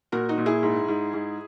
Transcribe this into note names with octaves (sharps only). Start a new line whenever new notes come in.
A#2 F#4 A#4
D#4 F#4
A#2
E4 G#4
G#2
G#2
G#2